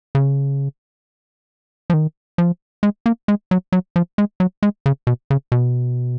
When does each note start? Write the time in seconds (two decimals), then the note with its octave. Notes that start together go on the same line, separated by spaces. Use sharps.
0.15 C#3
1.90 F3
1.94 D#3
2.38 F3
2.83 G#3
3.06 A#3
3.28 G#3
3.51 F#3
3.72 F#3
3.96 F3
4.18 G#3
4.40 F#3
4.63 G#3
4.86 C#3
5.07 B2
5.30 C#3
5.52 B2